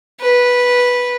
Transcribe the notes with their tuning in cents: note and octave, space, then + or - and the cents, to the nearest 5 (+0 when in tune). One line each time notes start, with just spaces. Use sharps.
B4 -10